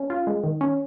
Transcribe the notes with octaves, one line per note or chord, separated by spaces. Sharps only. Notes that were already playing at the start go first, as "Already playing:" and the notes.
Already playing: C#4
F4
G#3
D#3
C#4